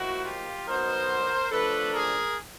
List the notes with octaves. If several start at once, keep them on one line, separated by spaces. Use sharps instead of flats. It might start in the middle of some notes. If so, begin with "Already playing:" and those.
Already playing: F3 A#3 D#4 E4 F#4
F4 G4
B2 F#3 B3 D#4 A#4 C5
F3 A3 D4 A4 B4
G#4 A#4